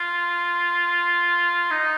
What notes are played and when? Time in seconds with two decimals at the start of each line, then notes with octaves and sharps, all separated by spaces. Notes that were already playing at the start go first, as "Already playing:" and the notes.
Already playing: F4
1.71 D#4